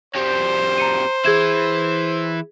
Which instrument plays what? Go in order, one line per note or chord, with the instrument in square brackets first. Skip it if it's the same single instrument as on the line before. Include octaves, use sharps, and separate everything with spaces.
[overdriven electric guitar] F2 G3 [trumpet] C5
[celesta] A#5 C#7 D#7
[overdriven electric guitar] E3 E4 [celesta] G#4 G#6 E7